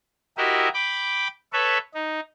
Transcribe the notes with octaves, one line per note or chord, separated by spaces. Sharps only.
E4 F#4 G4 A#4 D#5 E5
G5 B5 D6
A4 B4 C#5 E5
D#4